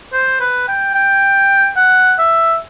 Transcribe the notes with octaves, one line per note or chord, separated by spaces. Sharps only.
C5
B4
G5
G5
F#5
E5